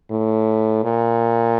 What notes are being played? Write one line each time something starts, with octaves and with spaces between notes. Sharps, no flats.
A2
A#2